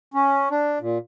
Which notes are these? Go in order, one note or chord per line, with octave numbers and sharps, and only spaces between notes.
C#4
D4
A#2